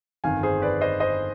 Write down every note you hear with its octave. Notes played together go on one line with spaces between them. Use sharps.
G1 F2 D#3 F5 G#5
G#4 C5
B4 D5
C5 D#5
C5 D#5